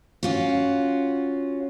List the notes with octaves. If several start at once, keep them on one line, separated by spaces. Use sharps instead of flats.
C#4 F4 F#4